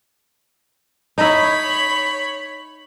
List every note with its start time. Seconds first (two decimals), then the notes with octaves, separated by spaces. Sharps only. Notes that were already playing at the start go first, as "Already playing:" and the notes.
1.18 D#4 E4 C#5 B5